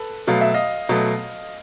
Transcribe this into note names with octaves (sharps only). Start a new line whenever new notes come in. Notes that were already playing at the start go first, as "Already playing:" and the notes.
Already playing: A4 B4
B2 F#3 A3 F5
E5
D#5 F5
B2 F#3 A3